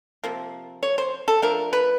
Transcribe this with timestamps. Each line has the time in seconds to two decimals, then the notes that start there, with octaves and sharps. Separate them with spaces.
0.24 C3 F3 A#3
0.83 C#5
0.98 C5
1.28 A4
1.42 F3 A3 D4 A#4
1.73 B4